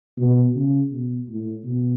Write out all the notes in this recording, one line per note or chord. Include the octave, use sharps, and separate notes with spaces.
B2
C#3
B2
A2
B2